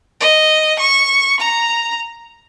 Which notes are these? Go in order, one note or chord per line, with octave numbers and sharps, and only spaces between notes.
D#5
C#6
A#5